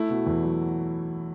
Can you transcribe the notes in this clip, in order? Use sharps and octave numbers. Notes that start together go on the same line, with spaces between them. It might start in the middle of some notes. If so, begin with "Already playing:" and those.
Already playing: A3 E4
B2
E2
F#3